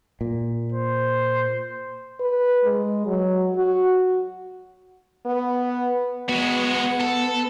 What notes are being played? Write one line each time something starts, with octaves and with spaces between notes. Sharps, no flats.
A#2
C5
B4
G#3
F#3
F#4
B3
G#3 B3 F#4 F#5
A4